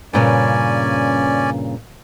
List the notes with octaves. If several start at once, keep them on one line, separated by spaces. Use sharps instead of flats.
G2 A#2 C#3 C#4 D5 G#5